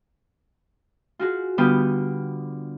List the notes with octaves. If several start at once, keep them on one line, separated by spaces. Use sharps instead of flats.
F4 F#4 G#4
D3 G3 B3 F4 G4 D#6